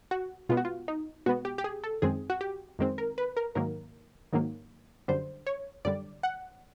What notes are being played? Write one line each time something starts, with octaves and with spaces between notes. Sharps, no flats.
F#4
B2 G#3 B3 F4
F#4
F4
D#4
B2 G#3 B3 F#4
G4
G4
G#4
A4
F#2 D#3 G#3 C4 G#4
F#4
G4
F#2 D#3 G#3 C4
A#4
B4
A#4
G#2 D#3 F#3 A#3 A#4
G#2 D#3 F#3 A#3
F#2 D3 G3 C5
C#5
F#2 D3 G3 D5
F#5